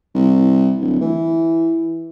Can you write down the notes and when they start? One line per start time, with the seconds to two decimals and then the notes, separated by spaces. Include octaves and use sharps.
0.14 C2
0.80 D1
1.01 E3